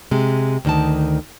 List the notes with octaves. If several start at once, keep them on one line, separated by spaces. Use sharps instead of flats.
C3 G#3
D2 D#3 A5